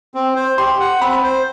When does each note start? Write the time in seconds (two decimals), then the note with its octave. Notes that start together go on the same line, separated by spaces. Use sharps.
0.14 C4
0.36 C5
0.58 G4 C6
0.80 F#5
1.01 C4 B5
1.23 C5